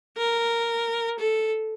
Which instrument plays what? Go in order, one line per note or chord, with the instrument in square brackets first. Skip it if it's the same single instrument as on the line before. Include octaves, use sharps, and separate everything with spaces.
[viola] A#4
A4